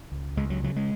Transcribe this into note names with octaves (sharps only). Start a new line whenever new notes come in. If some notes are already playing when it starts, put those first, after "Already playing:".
C#2
C#2 G#3
F#3
C#3 F#3
G#3